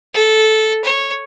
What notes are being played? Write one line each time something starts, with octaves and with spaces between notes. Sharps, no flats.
A4
C#5